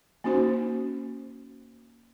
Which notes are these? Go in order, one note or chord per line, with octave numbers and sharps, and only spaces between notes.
A#3 C#4 D#4 F#4 C5